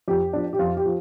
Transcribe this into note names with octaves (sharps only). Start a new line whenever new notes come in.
F2 G4
F3 D4
G4
F2 F4
G4
F3